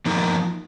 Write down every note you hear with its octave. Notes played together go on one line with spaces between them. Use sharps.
F3 A#3 D#4 A#4